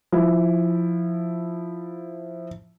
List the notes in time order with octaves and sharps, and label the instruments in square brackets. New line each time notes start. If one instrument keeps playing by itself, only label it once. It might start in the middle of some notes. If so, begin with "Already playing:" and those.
[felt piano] F3 E4